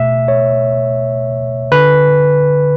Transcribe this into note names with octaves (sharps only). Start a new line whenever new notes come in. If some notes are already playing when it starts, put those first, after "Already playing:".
Already playing: B2 A3 E5
C#5
D3 B4